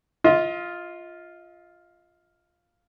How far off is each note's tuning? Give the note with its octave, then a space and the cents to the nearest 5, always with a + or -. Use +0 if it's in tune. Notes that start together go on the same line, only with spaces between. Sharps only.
F4 +0 D#5 +40